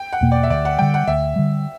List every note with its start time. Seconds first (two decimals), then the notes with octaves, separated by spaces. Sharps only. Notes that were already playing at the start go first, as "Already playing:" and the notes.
Already playing: G5
0.13 F#5
0.21 E2 B2 A#3
0.32 D5
0.43 E5
0.50 D2 D5
0.65 F#5
0.79 D3 G3 G5
0.94 F#5
1.07 D2 E5
1.36 D3 G3